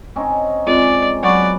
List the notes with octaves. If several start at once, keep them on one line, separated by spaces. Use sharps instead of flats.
C4 C#4 D#4
G#3 C4 F4 D5
F#3 B3 F#4 D5 F#5 C#6